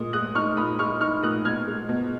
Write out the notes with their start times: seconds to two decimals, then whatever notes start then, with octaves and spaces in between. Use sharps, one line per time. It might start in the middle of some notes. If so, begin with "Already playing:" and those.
Already playing: A#2 G#3 D#6
0.13 G#3 D#6 F#6
0.35 D#4 C#6 F6
0.57 A#2 B5 D#6
0.79 G#3 C#6 F6
1.01 D#4 C#6 F6
1.23 A#2 D#6 F#6
1.45 B2 F6 G#6
1.67 G#3
1.89 B2